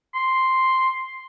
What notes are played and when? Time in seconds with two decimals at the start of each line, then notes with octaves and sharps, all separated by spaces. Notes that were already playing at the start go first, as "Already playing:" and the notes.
0.14 C6